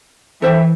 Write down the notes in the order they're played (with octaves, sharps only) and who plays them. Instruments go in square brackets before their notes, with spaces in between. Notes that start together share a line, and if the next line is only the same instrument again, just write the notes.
[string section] E3 [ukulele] A4 C5 E5 G5